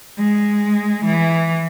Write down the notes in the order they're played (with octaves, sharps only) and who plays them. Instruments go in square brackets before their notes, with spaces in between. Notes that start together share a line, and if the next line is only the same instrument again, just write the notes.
[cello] G#3
E3